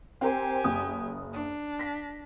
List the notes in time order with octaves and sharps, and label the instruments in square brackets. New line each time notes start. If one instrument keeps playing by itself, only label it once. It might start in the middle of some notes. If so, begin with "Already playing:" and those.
[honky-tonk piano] C4 A#4 C5 [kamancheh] G4 G#5
[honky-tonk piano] F#1 D#6
[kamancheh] D4
[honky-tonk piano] A#6 B6